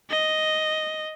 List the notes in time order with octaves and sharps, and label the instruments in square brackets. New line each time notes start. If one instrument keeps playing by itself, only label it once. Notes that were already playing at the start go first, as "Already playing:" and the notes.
[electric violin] D#5